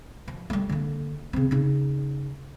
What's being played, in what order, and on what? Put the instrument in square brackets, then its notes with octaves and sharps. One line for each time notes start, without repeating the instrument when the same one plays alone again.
[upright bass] F3
G3 A3
D3 A#3
C#3 C4
C#3 D#4